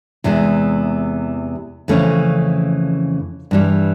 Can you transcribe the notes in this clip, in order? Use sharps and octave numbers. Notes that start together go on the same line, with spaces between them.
E2 C3 E3 G#3
F2 C#3 E3 A3 C#4
G2 E3 G3